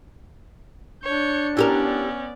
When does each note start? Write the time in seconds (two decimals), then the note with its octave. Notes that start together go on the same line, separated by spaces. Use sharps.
1.04 D4 C#5 G6 C#7
1.57 B3 C#4 E4 G4 A#4 D5